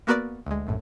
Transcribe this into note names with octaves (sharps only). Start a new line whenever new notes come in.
A#3 B3 F#4 A#4 B4 D5
D2 G#3
A#1 F#2 A2